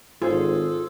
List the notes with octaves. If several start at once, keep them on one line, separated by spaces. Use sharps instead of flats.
G#1 F4 G#4 A4 C5